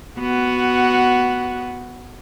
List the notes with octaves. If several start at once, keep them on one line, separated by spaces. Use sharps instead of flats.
B3 F#4